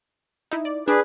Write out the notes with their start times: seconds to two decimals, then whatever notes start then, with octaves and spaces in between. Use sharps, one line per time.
0.52 D#4 E4
0.65 D5
0.88 D4 G#4 B4